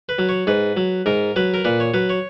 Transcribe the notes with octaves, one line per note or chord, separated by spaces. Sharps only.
B4
F#3
C#5
G#2 B4
F#3
G#2 A#4
F#3 B4
A#4
A#2 B4
C#5
F#3 B4
C#5